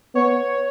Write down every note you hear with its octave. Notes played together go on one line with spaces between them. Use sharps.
B3 C#5